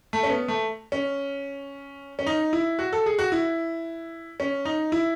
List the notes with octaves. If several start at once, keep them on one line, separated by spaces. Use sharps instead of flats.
A3
C#4
B3
A3
C#4
C#4
D#4
E4
F#4
A4
G#4
F#4
E4
C#4
D#4
E4